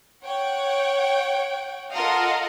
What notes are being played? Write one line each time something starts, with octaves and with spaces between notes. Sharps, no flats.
C#5 F#5 G5
F4 A4 A#4 D#5 F5 F#5